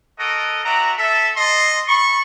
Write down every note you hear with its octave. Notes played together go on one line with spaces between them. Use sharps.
F#4 A4 A#4 D#5
C4 F#4 D5 E5 A#5
A4 E5
A4 D#5 C6
A4 B5 C#6